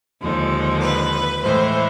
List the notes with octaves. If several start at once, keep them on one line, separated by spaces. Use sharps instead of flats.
D#2 D3 F3 G#3
B4
A2 E3 G#3 C5